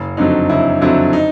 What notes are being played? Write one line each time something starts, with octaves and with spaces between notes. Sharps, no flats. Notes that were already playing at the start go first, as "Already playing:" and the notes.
Already playing: F#1
F2 D3 F#3 D#4
F#1 E4
F2 D3 F#3 E4
D#4